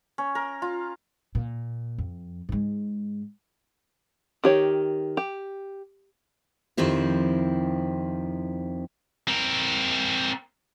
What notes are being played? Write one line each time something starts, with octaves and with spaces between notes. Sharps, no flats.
C#4
A#4
F4
A#2
F2
G#2 G#3
D#3 G4 C#5
G4
F2 D#3 F3 C4 E4 G4
C4 A#4